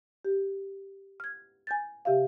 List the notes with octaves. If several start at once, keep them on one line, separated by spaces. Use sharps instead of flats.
G4
F6 G#6
G#5 G6 A6
C3 G4 E5 F5